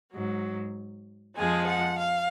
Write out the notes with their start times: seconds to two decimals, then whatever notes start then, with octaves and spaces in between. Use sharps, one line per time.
0.12 G#2 F#3
1.36 F2 F3 G#3 G#4
1.67 F#5
1.99 F5